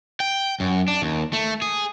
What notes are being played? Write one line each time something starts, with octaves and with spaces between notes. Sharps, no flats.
G5
F#2
D4
D#2
A3
G#4